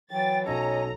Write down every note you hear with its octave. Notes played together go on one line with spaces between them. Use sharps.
E3 F#3 G5 A6
B1 F#3 C#4 A4 D#5 A#5